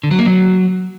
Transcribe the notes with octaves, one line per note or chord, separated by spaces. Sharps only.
D3
F#3
A#3
F#3